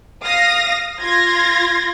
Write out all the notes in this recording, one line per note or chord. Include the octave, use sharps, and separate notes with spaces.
F5 D#6 A#6
F4 C6 G#6 A#6